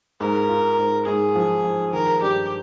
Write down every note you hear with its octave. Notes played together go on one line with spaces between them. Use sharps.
G#2 A#4
F4
G#2
G#2 G#4
F3
F3
D#3 A#4
G2 G4